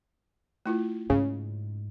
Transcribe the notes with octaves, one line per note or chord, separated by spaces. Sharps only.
A3 E4 F4
G#2 C#3